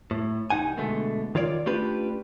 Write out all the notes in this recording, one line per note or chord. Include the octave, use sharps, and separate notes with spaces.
A2
C2 G2 D#4 F#5 G#5
B2 D3 G#3 A3
D#3 F4 C#5 D5
A3 C#4 D4 F4 G4 B4